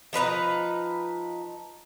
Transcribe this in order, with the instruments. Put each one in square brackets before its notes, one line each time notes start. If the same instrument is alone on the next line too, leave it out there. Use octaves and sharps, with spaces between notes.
[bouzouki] F3 D#4 B4 A#5